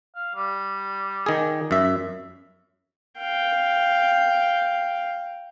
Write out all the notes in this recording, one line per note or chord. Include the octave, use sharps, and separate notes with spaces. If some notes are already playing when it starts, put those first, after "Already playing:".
F5
G3
D#3 G#4
F#2 E5
F5 G5